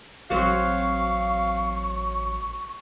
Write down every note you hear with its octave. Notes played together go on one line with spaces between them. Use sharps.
A1 F#3 C4 F#4 F5 C#6